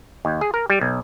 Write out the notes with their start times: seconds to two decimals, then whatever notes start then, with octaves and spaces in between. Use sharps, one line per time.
0.25 D#2
0.41 G#4
0.54 A#4
0.70 G3
0.81 B1